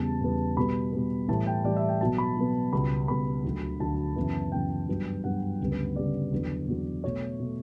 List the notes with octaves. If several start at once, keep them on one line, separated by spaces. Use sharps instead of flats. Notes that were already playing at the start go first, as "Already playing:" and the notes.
Already playing: E2 C#3 G3 B3 A5
E2 C#3 G3 B3
B2 G3 B3 B5
B2 G3 B3
A2 E3 G3 A5
G5
A2 E3 G3 D5
E5
G5
B2 F#3 B3 A5
B5
B2 F#3 B3
C#2 B2 G3 B3 B5
C#2 B2 G3 B3 B5
D2 D3 F#3
D2 D3 F#3 A5
F#2 C#3 E3 B3
F#2 C#3 E3 B3 G5
G2 F#3 B3
G2 F#3 B3 F#5
D2 C#3 G3 B3
B4
D2 C#3 G3 B3 D5
E2 D3 F#3 B3
E2 D3 F#3 B3
B2 A3 C#5
B2 A3